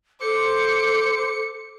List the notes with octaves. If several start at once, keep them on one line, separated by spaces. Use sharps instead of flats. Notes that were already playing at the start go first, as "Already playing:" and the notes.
A4 C5 D6 C#7